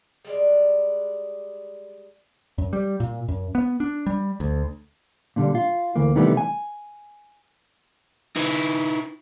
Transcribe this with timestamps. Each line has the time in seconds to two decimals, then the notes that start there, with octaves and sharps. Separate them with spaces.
0.25 G3 G#3 D5
2.58 F#2
2.73 G3
3.00 A#2
3.28 F#2
3.55 B3
3.80 D4
4.06 G3
4.40 D2
5.36 A#2 D3 G3
5.55 F4
5.96 D2 E3 A#3
6.16 C3 D#3 E3 G3 A3 B3
6.37 G#5
8.36 D#4 E4 B4